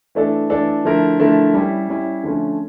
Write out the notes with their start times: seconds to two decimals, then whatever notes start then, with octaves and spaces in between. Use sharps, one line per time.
0.15 E3 A3 D4 A4
0.50 E3 A3 D4 A4
0.85 D3 F3 A3 E4 A#4
1.20 D3 F3 A3 E4 A#4
1.54 G3 C#4 E4
1.89 G3 C#4 E4
2.24 D3 F3 A3 C#4